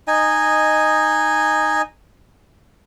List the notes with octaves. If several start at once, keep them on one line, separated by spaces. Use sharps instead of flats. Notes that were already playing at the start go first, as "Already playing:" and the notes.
D#4 D#5 G#5